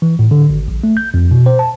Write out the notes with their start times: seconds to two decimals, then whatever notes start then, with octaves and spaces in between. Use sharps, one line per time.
0.02 E3
0.19 A2
0.31 D3
0.50 G#1
0.68 A#1
0.84 A3
0.97 G6
1.14 F2
1.31 B2
1.46 C5
1.59 A5